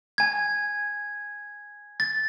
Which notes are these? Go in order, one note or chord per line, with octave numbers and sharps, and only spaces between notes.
G#5 G#6
A6